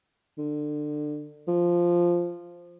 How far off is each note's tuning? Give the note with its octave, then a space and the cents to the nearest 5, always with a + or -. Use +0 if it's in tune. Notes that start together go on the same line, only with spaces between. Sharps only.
D3 +25
F3 -5